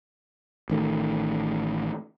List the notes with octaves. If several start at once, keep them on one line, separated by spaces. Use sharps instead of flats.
A1 D#3 A3